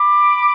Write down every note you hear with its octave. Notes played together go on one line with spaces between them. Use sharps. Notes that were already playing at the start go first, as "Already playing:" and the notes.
Already playing: B5 D6